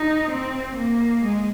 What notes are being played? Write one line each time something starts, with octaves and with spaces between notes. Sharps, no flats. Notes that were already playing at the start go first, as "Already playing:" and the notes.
Already playing: D#4
C4
A#3
G#3